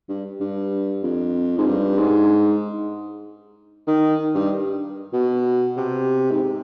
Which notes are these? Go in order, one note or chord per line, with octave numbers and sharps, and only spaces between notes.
G2
G2
F2
G#2
G2
G#2
D#3
G2
B2
C3
G#2